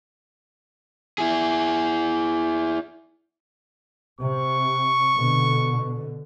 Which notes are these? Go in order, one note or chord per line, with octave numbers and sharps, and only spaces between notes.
E4 G#4
C3 C#6
B2 D3